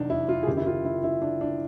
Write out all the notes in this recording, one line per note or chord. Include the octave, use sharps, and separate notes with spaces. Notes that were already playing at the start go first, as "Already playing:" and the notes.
Already playing: F1 E2 C3 F#3 D4 D#4
E4
F4
G#4
F#1 F#2 D#3 G4
E4
F4
E4
E4
D4
D4